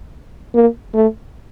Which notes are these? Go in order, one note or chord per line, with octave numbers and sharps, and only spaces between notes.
A#3
A3